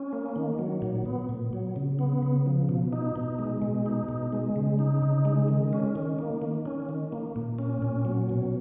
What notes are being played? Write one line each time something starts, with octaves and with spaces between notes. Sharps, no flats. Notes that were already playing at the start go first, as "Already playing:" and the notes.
Already playing: C#4
A#3
D#3
F#3
A#2
B3
A#2
F#3
C#3
B3
C#3
F3
B2
D#4
B2
G#3
B2
D#4
B2
G#3
C#3
D#4
C#3
G#3
D#3
C#4
D#3
A#3
D#3
C#4
D#3
A#3
A#2
C#4
A#2
F#3
B2